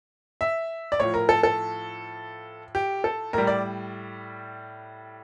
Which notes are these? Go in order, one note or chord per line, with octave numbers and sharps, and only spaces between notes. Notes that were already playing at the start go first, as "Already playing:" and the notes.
E5
D5
A2 F3 C#5
A#4
A4
A4
G4
A4
A2 G3 A#4
D5